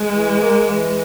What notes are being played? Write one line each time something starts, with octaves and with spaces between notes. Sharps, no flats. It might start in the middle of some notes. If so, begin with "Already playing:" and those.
Already playing: G#3
E3
A#3
E3